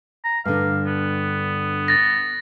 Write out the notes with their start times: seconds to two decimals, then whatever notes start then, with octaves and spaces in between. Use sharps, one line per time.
0.24 A#5
0.45 G2 D3 F5
0.86 B3
1.88 A6 A#6